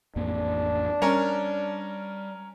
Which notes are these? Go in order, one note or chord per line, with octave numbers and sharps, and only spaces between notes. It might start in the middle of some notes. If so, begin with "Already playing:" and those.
A1 F2 A#3 D4
G3 C#4 A#4